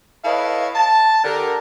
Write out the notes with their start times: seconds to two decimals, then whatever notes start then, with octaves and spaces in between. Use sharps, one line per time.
0.25 E4 A4 B4 C#5 D#5 F5
0.76 A5
1.24 D3 G4 A#4